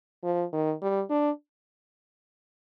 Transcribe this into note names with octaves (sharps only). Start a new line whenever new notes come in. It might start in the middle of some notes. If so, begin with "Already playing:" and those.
F3
D#3
G3
D4